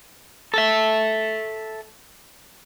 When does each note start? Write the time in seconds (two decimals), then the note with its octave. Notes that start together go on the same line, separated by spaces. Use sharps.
0.54 A4 E5